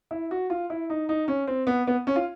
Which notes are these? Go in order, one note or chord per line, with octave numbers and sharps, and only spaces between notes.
E4
F#4
F4
E4
D#4
D#4
C#4
C4
B3
B3
C#4
F4